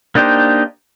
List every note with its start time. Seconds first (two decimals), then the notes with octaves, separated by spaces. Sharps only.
0.15 A#3 D4 D#4 G4 C5